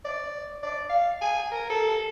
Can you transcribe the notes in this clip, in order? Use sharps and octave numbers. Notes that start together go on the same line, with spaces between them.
D5
D5
F5
G#5
A#4
A4